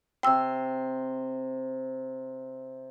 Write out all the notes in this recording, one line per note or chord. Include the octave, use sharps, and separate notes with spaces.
C3 G5 C6 E6